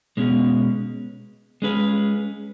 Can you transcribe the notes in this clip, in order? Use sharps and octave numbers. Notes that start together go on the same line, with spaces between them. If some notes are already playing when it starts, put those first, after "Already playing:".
B2 G#3 C#4
G#3 C#4 G#4 B4